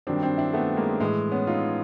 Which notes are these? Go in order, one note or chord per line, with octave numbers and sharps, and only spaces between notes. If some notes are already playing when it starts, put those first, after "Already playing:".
G2 D#3 F#3 C4 D4
C4 D4
D4 E4
A3 B3
G#3 A#3
A2 E3 G#3
B3 C#4
D#4 F4